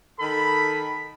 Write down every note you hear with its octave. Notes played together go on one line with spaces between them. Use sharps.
D#3 A4 B5